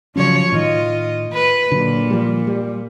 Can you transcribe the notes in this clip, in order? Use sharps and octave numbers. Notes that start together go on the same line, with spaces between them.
C#3 F3 F#3 C#4 C#5
A2 D#3 F4 D#5
B4
A#2 D3 F#3
F3 G3
G3